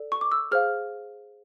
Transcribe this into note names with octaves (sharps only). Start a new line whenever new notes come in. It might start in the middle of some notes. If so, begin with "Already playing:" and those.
Already playing: A4 D5
C#6
D6
E6
G#4 C5 F5 F6